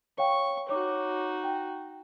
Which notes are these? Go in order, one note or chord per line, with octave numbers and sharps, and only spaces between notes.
C#5 F5 G5 C#6
D#4 F#4 C#5 D6
G5